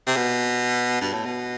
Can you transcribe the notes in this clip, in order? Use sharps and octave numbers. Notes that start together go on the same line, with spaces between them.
C3
B2
G2
A2
B2